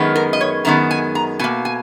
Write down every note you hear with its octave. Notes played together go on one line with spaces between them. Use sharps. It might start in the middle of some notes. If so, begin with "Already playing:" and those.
Already playing: F#2 D#3 G#3 B3
A#4
D#5
C#5
F#2 D#3 G#3 B3 A#5
G#5
A#5
B2 A#3 G#5
G#5